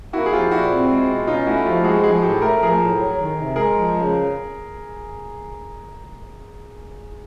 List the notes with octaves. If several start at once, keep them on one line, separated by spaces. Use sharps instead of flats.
A#3 E4 F#4
G#4
F3 F4 G4
A#2 E4 F#4
C4
G#3
B2
C#4 D#4 F4
A3 E4 F#4
F3 F4 G4
G#3 F#4 G#4
F3 F#4 G#4
A2 G4 A4
A3 A#4
F3 G#4 A#4
A2
F#3
D#3
C3
G#3 G#4 A#4
F3
C#3